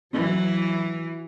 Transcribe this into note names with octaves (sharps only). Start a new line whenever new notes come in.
E3 F#3